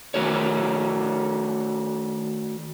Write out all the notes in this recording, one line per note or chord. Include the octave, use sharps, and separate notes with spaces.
D#3 A3 F#4 A#4 C#5